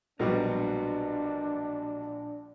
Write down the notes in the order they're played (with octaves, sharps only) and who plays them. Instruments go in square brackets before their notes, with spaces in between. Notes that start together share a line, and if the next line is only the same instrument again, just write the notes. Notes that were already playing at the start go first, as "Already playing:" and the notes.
[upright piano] A#1 [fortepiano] B2 F#3 G3 [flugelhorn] D4 [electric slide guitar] A#4 B4